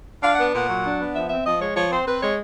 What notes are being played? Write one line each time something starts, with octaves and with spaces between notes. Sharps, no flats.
D4 F5
B3 F#5
A#2 F#5
F#3
D4
B3
F3 E5
C4 E5
F3 D#5
G#3 C#5
F3 C#5
C4 C5
C4 B4
G#3 C#5